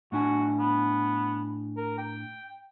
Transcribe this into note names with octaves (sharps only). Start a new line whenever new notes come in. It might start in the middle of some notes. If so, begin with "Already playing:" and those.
A2 D4 F#4 G#5
B3
A#4
G5